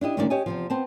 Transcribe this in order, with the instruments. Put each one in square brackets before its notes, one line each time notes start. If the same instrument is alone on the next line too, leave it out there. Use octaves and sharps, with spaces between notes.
[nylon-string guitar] D4 E4 G4 D#5
D2 D#3 G#3 C#4 D#4 D5
G4 C#5 D#5 G#5
E2 C3 F3
B3 C4 A5